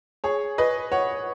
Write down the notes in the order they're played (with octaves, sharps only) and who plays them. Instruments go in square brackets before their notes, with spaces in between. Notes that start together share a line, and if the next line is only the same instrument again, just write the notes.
[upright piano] G#4 C#5
B4 D#5
C#5 F#5